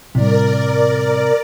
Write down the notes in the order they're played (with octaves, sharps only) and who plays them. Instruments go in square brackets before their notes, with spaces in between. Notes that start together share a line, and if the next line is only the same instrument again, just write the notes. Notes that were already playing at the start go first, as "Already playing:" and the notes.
[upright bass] A2 G3 [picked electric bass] C3 [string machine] A#4 D5